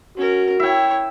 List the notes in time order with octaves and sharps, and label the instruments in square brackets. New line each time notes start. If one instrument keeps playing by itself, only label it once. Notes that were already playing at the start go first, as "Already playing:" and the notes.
[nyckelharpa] C#4 A#4 [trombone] F#4
[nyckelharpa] E4 C#5 [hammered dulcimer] E5 G5